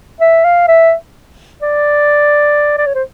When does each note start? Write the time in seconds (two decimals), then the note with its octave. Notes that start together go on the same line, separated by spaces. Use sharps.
0.21 E5
0.44 F5
0.68 E5
1.62 D5
2.78 D5
2.86 C#5
2.95 C5